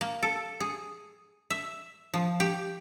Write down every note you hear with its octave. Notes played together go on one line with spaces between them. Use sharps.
A#3
A4
G#4
E5
F3
G4